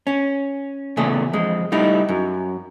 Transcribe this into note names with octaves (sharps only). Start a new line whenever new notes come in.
C#4
E2 A#2 C#3 A3 G#4
F2 G#3
G3 A3 D#4 E4
F#2